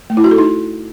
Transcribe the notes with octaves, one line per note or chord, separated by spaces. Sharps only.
A3
E4
F#4
A4
D#4